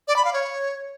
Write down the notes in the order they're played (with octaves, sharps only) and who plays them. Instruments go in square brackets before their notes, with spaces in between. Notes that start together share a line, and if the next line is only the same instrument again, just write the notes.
[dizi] D5
B5
F5
C#5